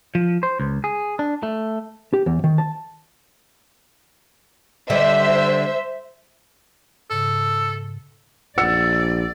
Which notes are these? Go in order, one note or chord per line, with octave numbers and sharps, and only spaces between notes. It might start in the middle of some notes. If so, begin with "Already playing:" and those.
F3
C5
C#2
G#4
D4
A3
G4
E2
D#3
A5
D3 G3 C5 D#5 E5
G#2 C#3 A4
A#1 D5 F#5 E6 C#7